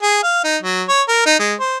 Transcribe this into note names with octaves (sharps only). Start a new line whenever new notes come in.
G#4
F5
D#4
F#3
C#5
A#4
D#4
G#3
C5